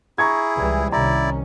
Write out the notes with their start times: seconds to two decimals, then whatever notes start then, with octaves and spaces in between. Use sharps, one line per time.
0.18 E4 G#4 A#5 C#6 G#6
0.56 C#2 E3 G3
0.92 C2 D#3 C#4 E4 D5 A#5